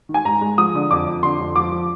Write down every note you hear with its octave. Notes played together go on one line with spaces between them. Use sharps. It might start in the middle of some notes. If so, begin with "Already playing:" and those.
D#3
G#5
G#2 A#5
G#3
F3 D#6
D3
F2 D6
F2
D3 C6
F2
F3 D6
F3